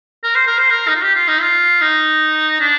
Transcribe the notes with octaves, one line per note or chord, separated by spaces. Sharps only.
A#4
C5
A#4
C5
A#4
D#4
F4
G4
F4
D#4
F4
D#4
D4